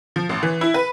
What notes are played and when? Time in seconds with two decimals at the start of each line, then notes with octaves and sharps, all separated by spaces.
0.16 F3
0.29 A1
0.43 E3
0.61 E4
0.74 B4